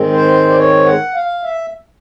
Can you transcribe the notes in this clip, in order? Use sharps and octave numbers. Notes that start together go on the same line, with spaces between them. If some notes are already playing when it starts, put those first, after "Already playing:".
Already playing: G#2 D#3 G#3 C4
C5
D5
C#5
F#5
F5
E5